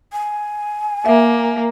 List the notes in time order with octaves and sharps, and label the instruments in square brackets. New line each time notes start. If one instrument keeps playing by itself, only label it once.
[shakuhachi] G#5
[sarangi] A#3 [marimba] E5